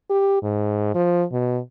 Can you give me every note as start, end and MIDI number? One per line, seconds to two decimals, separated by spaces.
0.10 0.42 67
0.42 0.95 44
0.95 1.23 53
1.32 1.59 47